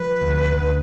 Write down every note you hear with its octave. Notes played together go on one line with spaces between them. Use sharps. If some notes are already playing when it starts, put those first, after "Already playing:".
Already playing: F3 B4
D2
D2